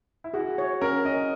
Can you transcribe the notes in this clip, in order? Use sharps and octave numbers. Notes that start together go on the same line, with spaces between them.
E4
F#4 G#4
C#5
C#4 A#4
C#4 D#5